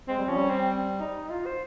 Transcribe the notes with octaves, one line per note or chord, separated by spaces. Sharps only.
G#3 C4
G3
F3 C#4
G3
C4
D#4
F4
C5